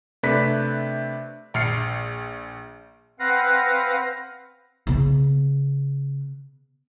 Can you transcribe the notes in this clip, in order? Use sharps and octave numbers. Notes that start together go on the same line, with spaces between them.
C3 A3 D4 B4 F#6 B6
A#1 F6 C7 C#7
C4 B4 F5 F#5 A#6
C#3 B3